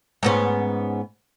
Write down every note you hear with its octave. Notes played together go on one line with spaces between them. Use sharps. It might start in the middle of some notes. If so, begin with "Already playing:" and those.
G#2 B3 C#4